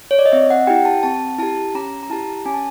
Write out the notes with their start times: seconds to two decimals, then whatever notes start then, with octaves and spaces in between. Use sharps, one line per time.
0.11 C#5
0.19 D5
0.26 D#5
0.32 C4 E5
0.50 F#5
0.67 E4 G4 G5
0.85 A5
1.03 C4 A5
1.39 E4 G4 A5
1.75 C#4 A#5
2.03 A#5
2.10 E4 G4 A5
2.45 C#4 G#5
2.54 A5